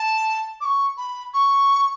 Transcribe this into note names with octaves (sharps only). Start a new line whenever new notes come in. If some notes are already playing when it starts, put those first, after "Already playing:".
Already playing: A5
D6
C#6
B5
C#6